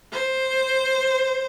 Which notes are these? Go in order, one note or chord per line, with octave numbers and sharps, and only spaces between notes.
C5